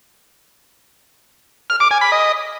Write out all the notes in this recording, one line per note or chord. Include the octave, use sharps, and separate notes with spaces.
F6
D6
G#5
B5
D#5